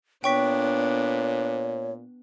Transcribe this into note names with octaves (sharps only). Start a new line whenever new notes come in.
A#2 B3 D4 C#5 G5 C#6 B6